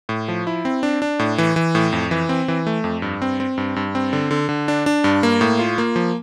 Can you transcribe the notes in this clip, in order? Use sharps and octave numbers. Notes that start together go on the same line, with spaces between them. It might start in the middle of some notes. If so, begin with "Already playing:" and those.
A2
F3
E4
C4
D4
D4
A2
E3
E3
A2
F2
E3
C4
E3
A3
F2
G2
C4
C4
G2
G2
C4
D3
D3
D3
D4
D4
G2
A#3
A2
F4
A#3
F3